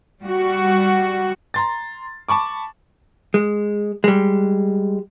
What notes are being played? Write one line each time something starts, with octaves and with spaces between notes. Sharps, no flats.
G3 F#4
A#5 C6 A6
A5 B5 C#6 D6
G#3
G3 G#3